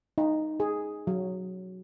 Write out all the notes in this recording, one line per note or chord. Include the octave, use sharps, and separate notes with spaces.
D#4
G#4
F#3